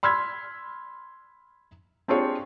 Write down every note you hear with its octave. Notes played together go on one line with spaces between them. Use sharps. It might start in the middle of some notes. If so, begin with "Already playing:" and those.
B5 C6 E6 F6 G#6 B6
C4 D4 F4 G4 G#4 C#5